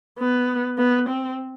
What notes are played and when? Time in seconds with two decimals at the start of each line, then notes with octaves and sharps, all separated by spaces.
0.19 B3
0.78 B3
1.08 C4